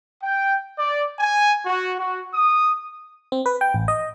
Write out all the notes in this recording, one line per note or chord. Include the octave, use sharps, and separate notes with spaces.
G5
D5
G#5
F#4
F#4
D#6
C4
B4
G5
A1
D#5